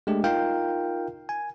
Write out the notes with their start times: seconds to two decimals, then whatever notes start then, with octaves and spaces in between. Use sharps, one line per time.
0.07 G#3 A3 D4 G4
0.24 D#4 F4 A#4 F5 G5
1.29 G#5